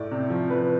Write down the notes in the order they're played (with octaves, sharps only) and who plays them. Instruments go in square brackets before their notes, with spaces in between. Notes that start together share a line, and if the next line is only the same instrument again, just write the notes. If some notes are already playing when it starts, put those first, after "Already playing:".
Already playing: [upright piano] A2 D5
C3
F3
F3 B4